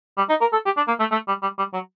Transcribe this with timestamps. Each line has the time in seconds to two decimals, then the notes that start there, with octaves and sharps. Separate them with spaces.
0.17 G3
0.29 D#4
0.41 A#4
0.52 A4
0.65 G4
0.77 D4
0.88 A#3
1.00 A3
1.12 A3
1.28 G3
1.42 G3
1.58 G3
1.73 F#3